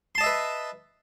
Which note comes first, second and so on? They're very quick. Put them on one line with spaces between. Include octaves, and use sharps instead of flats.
C6 A5 D#5 E5 B4